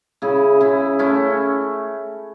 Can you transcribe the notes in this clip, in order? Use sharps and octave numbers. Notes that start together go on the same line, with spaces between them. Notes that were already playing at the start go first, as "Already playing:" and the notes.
C#3 E4 G#4
C#3 E4 G#4
A3 C#4 E4